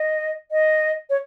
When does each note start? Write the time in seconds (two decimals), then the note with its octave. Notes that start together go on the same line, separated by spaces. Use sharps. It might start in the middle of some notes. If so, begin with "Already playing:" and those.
Already playing: D#5
0.51 D#5
1.10 C#5